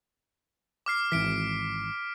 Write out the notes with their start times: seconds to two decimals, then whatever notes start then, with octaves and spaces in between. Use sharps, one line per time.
0.86 D6 F6 C7
1.12 G#1 E3 B6 D7